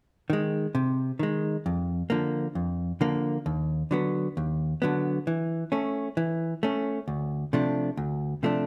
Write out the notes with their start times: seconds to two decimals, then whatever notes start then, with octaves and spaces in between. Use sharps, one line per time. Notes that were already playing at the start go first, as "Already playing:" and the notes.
0.30 D#3 G#3
0.75 C3
1.19 D#3 G#3
1.66 F2
2.10 D3 F3 A#3
2.55 F2
3.01 D3 F3 A#3
3.46 D#2
3.91 D3 F#3 B3
4.37 D#2
4.82 D3 F#3 B3
5.27 E3
5.72 A3 C#4
6.17 E3
6.63 A3 C#4
7.08 D2
7.53 C3 F3 A3 D4
7.97 D2
8.43 C3 F3 A3 D4